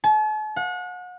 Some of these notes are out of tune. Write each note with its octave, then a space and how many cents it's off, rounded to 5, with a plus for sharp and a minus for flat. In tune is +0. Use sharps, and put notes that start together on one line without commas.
A5 -45
F#5 -35